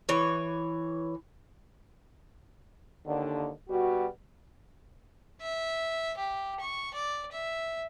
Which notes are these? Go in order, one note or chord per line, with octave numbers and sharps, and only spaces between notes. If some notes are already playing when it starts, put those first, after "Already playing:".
E3 C#5
D#2 D3
B2 G3 F#4
E5
G4
C#6
D5
E5